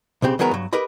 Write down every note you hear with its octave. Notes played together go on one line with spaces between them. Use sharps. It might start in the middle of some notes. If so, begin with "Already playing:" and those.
B1 C#3 C4 G4
D#3 F#3 G#3 B3 A#4
G2 F#3
G4 A#4 B4 D#5 B5